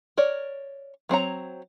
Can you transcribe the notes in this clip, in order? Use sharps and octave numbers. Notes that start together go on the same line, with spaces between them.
A#4 C#5 D5
F#3 C4 C#5 A#5